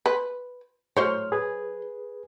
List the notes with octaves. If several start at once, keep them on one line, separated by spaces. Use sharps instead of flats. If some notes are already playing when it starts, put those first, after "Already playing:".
B4
A2 F#3 C5 C#5 F6
G#4 B4